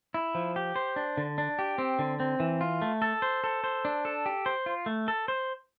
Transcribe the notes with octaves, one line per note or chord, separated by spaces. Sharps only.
E4
F3
G4
C5
D4
D3
D4
G4
C4
D3
C4
E3
F4
A3
A4
C5
A4
C5
D4
A4
G4
C5
F4
A3
A4
C5